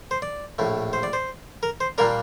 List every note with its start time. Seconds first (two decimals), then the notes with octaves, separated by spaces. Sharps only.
0.11 C5
0.22 D5
0.58 A#1 A2 A3
0.93 C5
1.03 D5
1.13 C5
1.63 A#4
1.80 C5
1.98 A#2 G3 A#3 D4 A#4